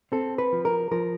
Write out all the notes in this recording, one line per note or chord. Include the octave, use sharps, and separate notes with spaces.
C4 A4
B4
F3
A#4
F3 A#4